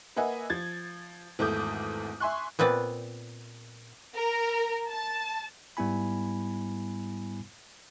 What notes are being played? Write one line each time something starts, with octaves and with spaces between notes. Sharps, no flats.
A#3 B4 D#5 E5 F#5 G#5
F3 G#6 A6
G#1 E2 A3 D6 D#6 G6
E5 G#5 C6 C#6 F#6
A#2 B3 C4 B4 D5
A#4
A5
G#2 G3 B3 E4 G#5 B5